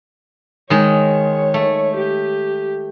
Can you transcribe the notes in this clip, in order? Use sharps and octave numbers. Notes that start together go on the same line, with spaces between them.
D#3 G#3 C#5
A3
G4